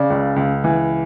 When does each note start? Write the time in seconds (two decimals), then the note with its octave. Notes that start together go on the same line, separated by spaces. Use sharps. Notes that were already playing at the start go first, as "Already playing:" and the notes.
Already playing: C#3 D5
0.10 C#2
0.36 C#2
0.64 E3